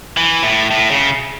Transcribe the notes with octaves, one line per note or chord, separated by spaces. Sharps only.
E3
A2
A2
C#3